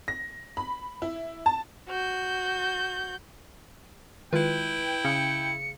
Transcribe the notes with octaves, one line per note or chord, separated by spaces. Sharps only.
A#6
B5
E4
A5
F#4 G6
D#3 G#3 E4 F4 B4 G5
C#3 C#4 C#7